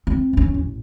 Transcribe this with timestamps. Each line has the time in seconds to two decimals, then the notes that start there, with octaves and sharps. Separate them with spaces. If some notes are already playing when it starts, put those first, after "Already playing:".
0.07 C4
0.33 E2 C#4
0.54 A1